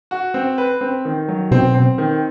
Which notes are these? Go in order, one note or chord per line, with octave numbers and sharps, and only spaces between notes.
F#4
C4
B4
C4
D#3
F#3
B2 C4
C4
D#3